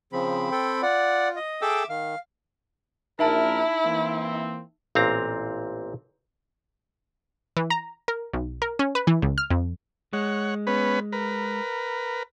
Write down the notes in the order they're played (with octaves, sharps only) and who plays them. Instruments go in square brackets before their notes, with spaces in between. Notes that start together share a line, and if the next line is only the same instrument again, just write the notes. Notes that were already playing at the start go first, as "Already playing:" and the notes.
[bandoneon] C#3 F3 [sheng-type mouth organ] C4 B5
[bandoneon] A4 G5
[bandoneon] F4 [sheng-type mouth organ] D5 F#5
[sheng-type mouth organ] D#5
[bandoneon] G#4 A4 G5 [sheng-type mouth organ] E5 D6 E6
[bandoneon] D#3 [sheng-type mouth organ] F5
[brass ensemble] A#1 A#4 [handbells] D#4 E5 A5 [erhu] E4
[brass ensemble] E3 A#3 C4
[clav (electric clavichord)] A1 A#2 C4 F5 A#5
[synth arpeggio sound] E3
A#5
A#4
B1
A#4
C#4
B4
E3
C#2
F6
F2
[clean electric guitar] G#3 [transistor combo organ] C#5 F#5
[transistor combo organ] B3 C#4 B4
A#4 B4